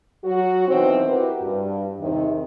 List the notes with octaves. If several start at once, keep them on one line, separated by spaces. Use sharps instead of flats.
F#3 F#4
B2 D#3 E3 C4
E4 F#4 G4 A#4 B4
G2
E2 C3 D#3